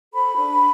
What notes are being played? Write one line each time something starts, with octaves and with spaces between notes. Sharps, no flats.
A4 C5 B5
D4